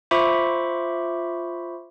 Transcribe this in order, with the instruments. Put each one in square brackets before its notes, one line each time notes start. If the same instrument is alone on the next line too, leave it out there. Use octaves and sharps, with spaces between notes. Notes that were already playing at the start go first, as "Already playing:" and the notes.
[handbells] F4 C5 E5 B5 C#6 D6